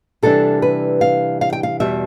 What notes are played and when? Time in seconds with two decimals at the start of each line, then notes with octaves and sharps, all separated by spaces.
0.23 C3 E3 G3 D4 A4
0.62 B4
1.01 F5
1.41 F5
1.53 G5
1.63 F5
1.80 E2 B2 G3 E5